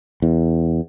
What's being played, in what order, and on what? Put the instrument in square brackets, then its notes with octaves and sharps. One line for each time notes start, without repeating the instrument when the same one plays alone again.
[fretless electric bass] E2